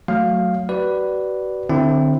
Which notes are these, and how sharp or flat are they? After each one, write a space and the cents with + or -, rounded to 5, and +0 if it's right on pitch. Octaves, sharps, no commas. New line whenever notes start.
F#3 +0 A3 +0 F5 +0
F#4 +40 B4 +0 D5 +0
D3 +30 C4 +0 E4 +0